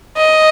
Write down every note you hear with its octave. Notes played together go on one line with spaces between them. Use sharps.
D#5